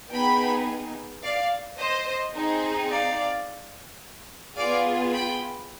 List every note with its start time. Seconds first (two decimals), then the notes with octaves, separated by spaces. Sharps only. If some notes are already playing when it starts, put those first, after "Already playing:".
0.12 B3 D#4 G#4 G5 B5
1.23 D5 F5
1.78 C5 D#5
2.34 C4 D#4 G#4
2.90 D5 F5
4.57 B3 F4 G#4 D5 F5
5.13 G5 B5